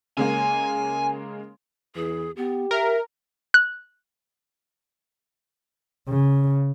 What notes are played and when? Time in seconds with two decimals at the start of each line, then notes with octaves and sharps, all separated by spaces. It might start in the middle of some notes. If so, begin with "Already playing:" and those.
0.17 C#3 G#3 A#3 G#5
1.95 E2 E3 G#4
2.37 B3 G4
2.71 A#4 E5
3.54 F#6
6.08 C#3